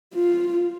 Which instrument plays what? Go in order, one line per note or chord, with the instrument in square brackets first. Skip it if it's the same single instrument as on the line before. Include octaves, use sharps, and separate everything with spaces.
[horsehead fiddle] F4